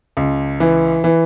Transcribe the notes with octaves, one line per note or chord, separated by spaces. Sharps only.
C#2
E3
E3